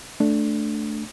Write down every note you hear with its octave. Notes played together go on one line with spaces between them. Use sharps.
A3 D4